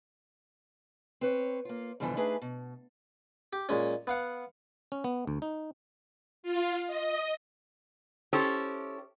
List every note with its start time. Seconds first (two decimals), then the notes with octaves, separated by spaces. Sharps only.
1.21 C4 B4 C#5
1.65 A#3 F4
2.00 G2 B2 D3 E3 F3
2.17 A3 D4 D#4 G#4 B4 G#5
2.42 B2
3.53 G4
3.69 A#2 G#3 C#4
4.07 B3 F5 F#5
4.92 C#4
5.04 B3
5.27 D2
5.42 D#4
6.43 F4
6.87 D#5
8.33 C#4 E4 G4 A4 C5